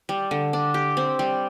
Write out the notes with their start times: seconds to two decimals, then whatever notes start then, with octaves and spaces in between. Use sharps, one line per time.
0.09 G3
0.31 D3
0.53 D4
0.74 G4
0.97 C4
1.19 G3